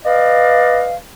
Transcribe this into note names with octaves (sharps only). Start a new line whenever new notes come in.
B4 D5 D#5 F5